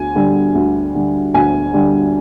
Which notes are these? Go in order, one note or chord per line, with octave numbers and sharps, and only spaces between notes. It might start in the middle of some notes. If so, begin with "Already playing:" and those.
Already playing: D2 G#5
D3 G3
D2
D3 G3
D2 G#5
D3 G3